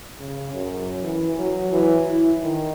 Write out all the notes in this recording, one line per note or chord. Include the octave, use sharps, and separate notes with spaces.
C#3
F#2
E3
F#3
E3
E4
D#3